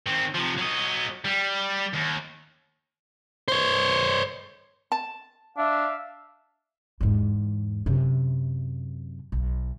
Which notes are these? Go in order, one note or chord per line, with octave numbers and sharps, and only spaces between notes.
D#3 C4
C3 F3
F#3 D#5
G3
D#2
C5 C#5
A5
D4 E5 F5
E2 G#2
F#2 C3
B1